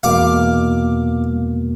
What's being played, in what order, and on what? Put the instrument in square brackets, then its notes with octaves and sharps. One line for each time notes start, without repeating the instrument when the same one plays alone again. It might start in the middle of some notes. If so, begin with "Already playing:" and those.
[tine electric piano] E2 B2 A#3 [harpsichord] F5 D6